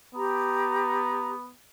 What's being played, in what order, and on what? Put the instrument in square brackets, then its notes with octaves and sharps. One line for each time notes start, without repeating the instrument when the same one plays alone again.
[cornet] B3 [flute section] G4 A#5